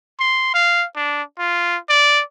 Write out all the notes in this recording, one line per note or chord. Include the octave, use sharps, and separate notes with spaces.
C6
F5
D4
F4
D5